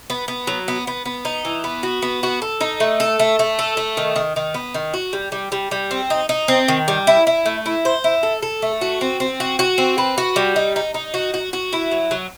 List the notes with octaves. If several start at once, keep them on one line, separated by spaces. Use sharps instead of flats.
B3
B3
F#3
B3
B3
B3
D#4
E3
B3
F#4
B3
F#4
A4
D#4
A3
A4
A3
A3
A4
A3
D#3
D#3
D#3
B3
D#3
F#4
G3
G3
G3
G3
C4
D#4
D#4
C4
D#3
G3
E4
E4
A3
E4
C5
E4
A4
A4
A3
F#4
C4
C4
F#4
F#4
C4
B4
F#4
G3
D#4
D#4
D#4
F#4
F#4
F#4
E4
F#3
F#3